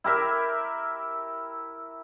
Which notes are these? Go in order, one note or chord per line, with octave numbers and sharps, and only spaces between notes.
E4 G4 A#4 E5